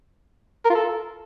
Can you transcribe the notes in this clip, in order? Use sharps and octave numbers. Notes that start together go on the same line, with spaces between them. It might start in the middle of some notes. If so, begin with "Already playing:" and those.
A#4
F4
A4